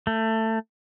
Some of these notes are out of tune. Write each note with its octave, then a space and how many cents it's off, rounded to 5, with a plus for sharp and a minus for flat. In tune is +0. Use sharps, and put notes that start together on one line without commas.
A3 +20